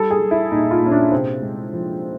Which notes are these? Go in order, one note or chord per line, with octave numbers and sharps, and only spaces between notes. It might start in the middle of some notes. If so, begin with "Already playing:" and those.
Already playing: G3 A4
G#4
G3
E4
A#2 D#4
F4
A#2 C#4
D4
C3 C4
G#3
F3